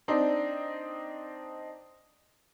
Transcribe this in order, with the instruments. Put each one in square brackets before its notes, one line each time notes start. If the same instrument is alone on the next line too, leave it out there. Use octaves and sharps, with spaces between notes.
[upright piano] C4 D4 D#4